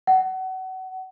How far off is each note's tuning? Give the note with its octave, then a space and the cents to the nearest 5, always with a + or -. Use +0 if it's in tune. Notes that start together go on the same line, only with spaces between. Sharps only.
F#5 +30